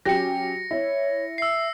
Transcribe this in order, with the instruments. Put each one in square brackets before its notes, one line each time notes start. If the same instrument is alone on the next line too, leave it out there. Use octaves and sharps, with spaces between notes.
[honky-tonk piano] F#3 G4 [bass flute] C#4 [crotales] A#6 C#7
[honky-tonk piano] E4 [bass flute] C#5
[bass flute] E5 [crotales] E6 C7